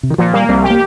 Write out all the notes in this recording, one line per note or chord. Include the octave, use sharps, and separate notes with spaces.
C3
D#3
A#2 F3
G3 A#3
C2 G3
G4
A#3